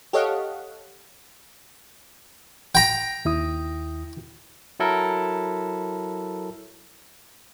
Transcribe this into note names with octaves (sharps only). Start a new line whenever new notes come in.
G4 A4 C#5 D#5 F5 F#5
G5 A#5
D#2 E4 D#6
F#3 E4 A4 A#4